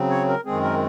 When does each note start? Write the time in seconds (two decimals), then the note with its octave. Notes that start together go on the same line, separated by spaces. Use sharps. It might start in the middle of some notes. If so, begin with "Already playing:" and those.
Already playing: C#3 F#3 C4
0.10 C#5
0.28 A#4
0.45 F#2 D#3 G#3 C4 G#4
0.63 A#4